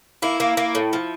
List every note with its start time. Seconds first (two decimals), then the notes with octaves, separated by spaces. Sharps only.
0.22 A#3 E4
0.40 A#3
0.57 A#3
0.75 A2
0.93 F3